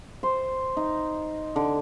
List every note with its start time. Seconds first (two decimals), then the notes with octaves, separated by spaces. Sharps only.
0.23 C5
0.77 D#4
1.56 D3